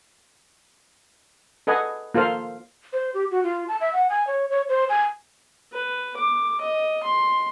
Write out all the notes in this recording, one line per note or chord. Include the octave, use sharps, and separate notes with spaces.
A4 B4 D#5 F#5 G#5
A#3 F4 A4 C5 F5
C5
G4
F#4
F4
A5
E5
F#5
G#5
C#5
C#5
C5
G#5
B4
D6
D#5
C6